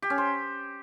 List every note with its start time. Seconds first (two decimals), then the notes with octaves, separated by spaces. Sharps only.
0.02 G4
0.10 C#4
0.18 C5